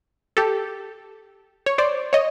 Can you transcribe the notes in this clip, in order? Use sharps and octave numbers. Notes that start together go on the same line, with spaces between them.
G4 A4
C#5
C5 D5
C#5 D#5